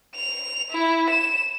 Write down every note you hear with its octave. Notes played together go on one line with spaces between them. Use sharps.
F7
E4
E7